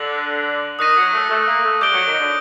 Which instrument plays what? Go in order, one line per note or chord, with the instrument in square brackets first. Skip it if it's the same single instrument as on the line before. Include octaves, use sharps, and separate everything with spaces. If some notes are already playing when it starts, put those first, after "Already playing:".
Already playing: [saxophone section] D3 [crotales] D6 F#6 A#6 F#7
[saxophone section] D#3 [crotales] D#6 F#6 A#6 D#7
[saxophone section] F#3
A3
A3
A#3
A3
[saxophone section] G3 [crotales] D6 G6 D7 G7
[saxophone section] F#3
D#3
D3